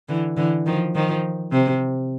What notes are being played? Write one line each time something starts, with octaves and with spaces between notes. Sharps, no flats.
D3 E3
D3 E3
D#3 F3
D#3 F3
C3